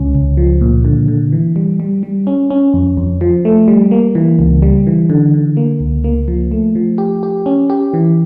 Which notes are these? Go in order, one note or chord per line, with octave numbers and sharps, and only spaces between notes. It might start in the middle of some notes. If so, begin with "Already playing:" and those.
Already playing: C#2 C#4
C#2
F3
A#2
D3
D3
E3
G3
G3
G3
C#4
C#4
F2
F2
F3
A3
G3
A#3
E3
C#2
G3
E3
D3
D3
A#3
C#2
A#3
F3
A3
F3
G4
G4
C#4
G4
E3